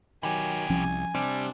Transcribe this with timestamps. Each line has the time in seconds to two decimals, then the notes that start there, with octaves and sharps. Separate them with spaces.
0.23 B2 D#3 F#3 G4 G#5
0.70 C2 F3 C#4
1.15 C3 G3 C4 D4